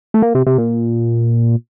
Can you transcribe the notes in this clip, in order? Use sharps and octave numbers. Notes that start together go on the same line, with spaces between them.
A3
A#3
C3
C3
A#2